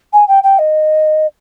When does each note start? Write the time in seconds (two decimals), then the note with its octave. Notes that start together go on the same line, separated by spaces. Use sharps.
0.13 G#5
0.28 G5
0.43 G5
0.58 D#5